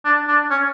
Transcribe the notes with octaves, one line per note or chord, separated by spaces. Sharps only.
D4
D4
C#4